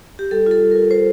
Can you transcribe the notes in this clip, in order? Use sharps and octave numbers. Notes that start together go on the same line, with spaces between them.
G4
G3 A4
F4 A4
G3
A#4
F4
F4 C5